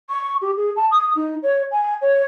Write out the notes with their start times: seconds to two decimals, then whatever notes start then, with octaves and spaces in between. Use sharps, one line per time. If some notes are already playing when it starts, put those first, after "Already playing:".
0.10 C#6
0.42 G4
0.57 G#4
0.76 A5
0.91 D#6
1.16 D#4
1.43 C#5
1.72 G#5
2.02 C#5